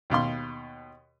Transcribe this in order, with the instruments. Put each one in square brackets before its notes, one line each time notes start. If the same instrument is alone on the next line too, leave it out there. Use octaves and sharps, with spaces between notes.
[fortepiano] D#2 B2 F5 C6